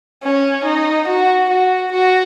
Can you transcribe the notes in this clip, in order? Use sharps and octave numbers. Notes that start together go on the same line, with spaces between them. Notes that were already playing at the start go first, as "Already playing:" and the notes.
C#4
D#4
F#4
F#4
F#4